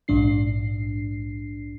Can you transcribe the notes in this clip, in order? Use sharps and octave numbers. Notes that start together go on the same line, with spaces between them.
A#1 G#2 D4 C7